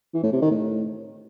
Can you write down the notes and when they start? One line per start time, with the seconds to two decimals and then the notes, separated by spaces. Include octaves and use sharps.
0.14 E3
0.23 A2
0.32 C3
0.42 D#3
0.51 A2